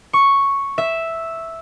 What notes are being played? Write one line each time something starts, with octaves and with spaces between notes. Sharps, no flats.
C#6
E5